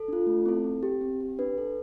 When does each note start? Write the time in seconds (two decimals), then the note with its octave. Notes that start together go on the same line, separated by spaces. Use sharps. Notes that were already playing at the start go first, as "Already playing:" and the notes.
Already playing: A4
0.08 D4 F4
0.27 A3
0.46 C4 E4 A4
0.64 C4
0.83 G4
1.01 C4
1.21 G4
1.39 D4 B4
1.58 A4